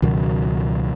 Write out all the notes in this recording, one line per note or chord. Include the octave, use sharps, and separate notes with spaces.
C#2 B2 D#3 F#3